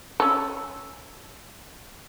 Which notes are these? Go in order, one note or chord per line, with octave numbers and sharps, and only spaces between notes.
C#4 A4